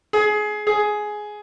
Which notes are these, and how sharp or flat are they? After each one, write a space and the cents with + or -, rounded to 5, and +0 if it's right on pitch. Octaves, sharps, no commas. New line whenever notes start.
G#4 +20
G#4 +10